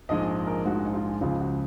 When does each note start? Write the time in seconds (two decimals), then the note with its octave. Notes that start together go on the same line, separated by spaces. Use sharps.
0.09 A#1 G#2 F3 G#3 D#5
0.47 A#4
0.65 A#1 G#2 F3 G#3 F#4
0.85 D#4
0.93 F4
1.21 C#2 C#3 F3 G#3 F4
1.40 F#4